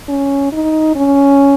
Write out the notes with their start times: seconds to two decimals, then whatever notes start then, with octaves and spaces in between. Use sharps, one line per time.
0.09 C#4
0.53 D#4
0.96 C#4